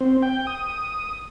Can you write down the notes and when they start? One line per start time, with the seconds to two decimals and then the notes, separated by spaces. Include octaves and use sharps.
0.01 C4
0.23 G5
0.47 D#6